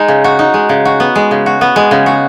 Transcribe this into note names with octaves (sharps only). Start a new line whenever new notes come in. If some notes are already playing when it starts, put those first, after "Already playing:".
Already playing: G#3 D#4
C#3
F#4
D#4
G#3
C#3
F#4
B3
G#3
C#3
F#4
B3
G#3
C#3
F#4